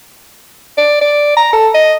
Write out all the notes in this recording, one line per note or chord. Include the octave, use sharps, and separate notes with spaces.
D5
D5
A#5
A4
D#5